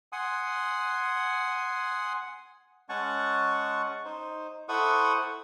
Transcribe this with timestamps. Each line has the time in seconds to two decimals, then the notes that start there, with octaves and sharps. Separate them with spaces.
0.12 F#5 G#5 C6 D#6
2.89 G#3 C#4 F#5 G#5 A5 C#6
4.05 D#4 C5
4.69 E4 A4 C5 F#5 C#6 D#6